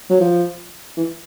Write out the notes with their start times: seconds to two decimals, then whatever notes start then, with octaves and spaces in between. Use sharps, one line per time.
0.10 F#3
0.21 F3
0.97 E3